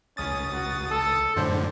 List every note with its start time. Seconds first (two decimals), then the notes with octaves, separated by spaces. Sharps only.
0.17 C#2 C#4 D#6 A6
0.53 F#4
0.91 A4
1.36 F#2 A2 D3 C5